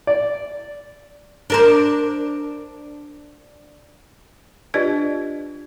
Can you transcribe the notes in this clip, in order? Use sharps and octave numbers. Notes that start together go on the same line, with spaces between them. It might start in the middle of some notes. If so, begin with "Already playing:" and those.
D5
D4 A#4 C5
D4 F4 G4 B4 D5 D#5